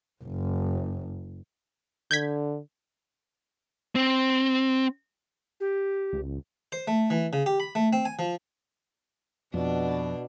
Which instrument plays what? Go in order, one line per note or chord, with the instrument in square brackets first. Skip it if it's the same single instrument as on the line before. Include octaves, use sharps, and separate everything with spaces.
[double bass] F#1
[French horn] D3 [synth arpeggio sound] G6 G#6 B6
[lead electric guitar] C4
[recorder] G4
[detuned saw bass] C#2
[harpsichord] C5
A3
E3
C#3
G4
B5
A3
C4
G#5
F3
[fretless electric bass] F2 [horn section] B2 [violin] D4